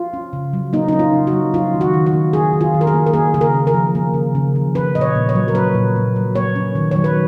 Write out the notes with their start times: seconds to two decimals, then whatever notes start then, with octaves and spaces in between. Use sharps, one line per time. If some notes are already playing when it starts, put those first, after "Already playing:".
Already playing: F4
0.13 C#4
0.33 C#3
0.53 F#3
0.73 A#3 D#4
0.88 C#4 D#4
0.99 F4
1.13 C#3
1.27 F#4
1.33 F#3
1.54 C#4 F4
1.74 D#3
1.81 F#4
1.94 D#3
2.06 F#4
2.13 A#3
2.33 C#4 G#4
2.53 D#3
2.61 F4
2.74 D#3
2.81 A#4
2.87 G#4
2.94 A#3
3.06 A#4
3.14 A#3 G#4
3.34 C#3 G#4
3.41 A#4
3.54 C#3
3.67 A#4
3.74 F3
3.95 A#3
4.14 C#3
4.35 C#3
4.55 F3
4.75 C#4 B4
4.95 A#2 D#5
5.01 C#5
5.15 A#2
5.29 C#5
5.35 F#3
5.48 A#4
5.55 C#4 B4
5.75 A#2
5.96 A#2
6.16 F#3
6.35 A#3 C#5
6.56 C#4
6.75 D#3
6.91 F#3 C#5
7.04 B4